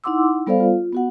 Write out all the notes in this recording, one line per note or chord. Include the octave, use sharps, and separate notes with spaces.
D#4 E4 F#5 C6 D6 E6
G3 B3 A4 C5 D5 F5
F4
B3 F#4 F#5